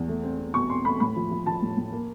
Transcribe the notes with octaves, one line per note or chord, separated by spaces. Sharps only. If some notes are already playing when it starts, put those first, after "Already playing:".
Already playing: E2
A3
C4
C4
B2 C#6
C4 C6
A3 B5
A2 B5
F3
F3
F3 A5
A2
A2
A#3